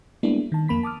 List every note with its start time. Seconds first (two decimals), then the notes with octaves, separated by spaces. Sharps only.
0.23 G3 G#3 A#3 B3 D4 E4
0.52 D#3 A5
0.68 F2 A#3 B5 B6
0.83 A5 D6 D#6 F6